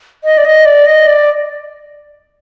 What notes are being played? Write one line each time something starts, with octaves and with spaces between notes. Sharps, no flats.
D#5
D5
D#5
D5
D#5
D5